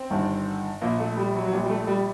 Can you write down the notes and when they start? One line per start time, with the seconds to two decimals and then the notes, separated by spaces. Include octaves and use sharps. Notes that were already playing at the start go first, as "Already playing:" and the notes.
Already playing: C4
0.10 G1 G2 D#3
0.81 A#1 A#2 A#3
1.00 A3
1.17 G3
1.35 F#3
1.45 F#3
1.53 A#1 A#2 G3
1.66 G3
1.70 A3
1.87 G3